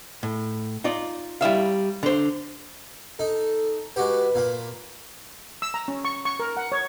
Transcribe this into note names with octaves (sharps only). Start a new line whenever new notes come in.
A2
D#4 F4 D5
G3 E4 E5 F5
D3 C5
D#4 A4
G#3 F#4 G4 B4
A#2 A#3
E6
A#5
C#4
C#6
C#6
A#4
F#5
C#5